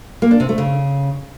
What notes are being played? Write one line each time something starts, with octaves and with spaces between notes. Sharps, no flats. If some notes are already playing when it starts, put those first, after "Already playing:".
A#3
D4
C3
A3
C#3